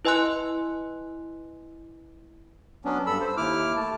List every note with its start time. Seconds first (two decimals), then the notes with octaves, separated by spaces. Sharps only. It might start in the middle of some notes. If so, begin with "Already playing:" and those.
0.05 E4 B4 D#5 G#5 C6 F#6
2.85 F#3 B3 C#4 D4
3.06 G2 A4 B5 E6
3.21 C5
3.37 D#2 E4 D6 F6
3.76 A3 A5